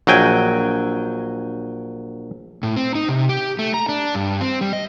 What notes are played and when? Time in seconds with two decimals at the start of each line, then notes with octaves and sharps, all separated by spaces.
0.07 A#1 F#3 G5 G#5
2.63 A2
2.76 C4
2.95 D#4
3.08 C3
3.29 G4
3.59 A3
3.74 A#5
3.89 D4
4.15 G2
4.41 C4
4.61 G3
4.73 D#5